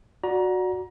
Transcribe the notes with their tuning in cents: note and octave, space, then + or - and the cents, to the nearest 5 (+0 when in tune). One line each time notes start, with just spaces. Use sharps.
F#4 -10 D5 +0 A#5 +25